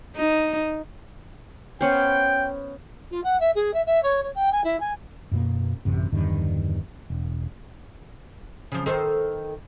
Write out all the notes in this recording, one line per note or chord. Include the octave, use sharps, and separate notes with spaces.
D#4
B3 C#4 C5 G5
F4
F#5
E5
G#4
E5
E5
C#5
C#5
G5
G#5
E4
G#5
F#2 B2 A#3
A1 F#2 C3
E2 G2 D3 D#3
E1
C#3 F3
D#3 A4 C5